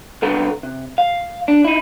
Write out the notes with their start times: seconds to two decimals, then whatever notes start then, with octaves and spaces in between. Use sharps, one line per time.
0.22 C2 D3 B3 A4 A#5
0.63 C3
0.98 F5
1.48 D4
1.65 D#4 E4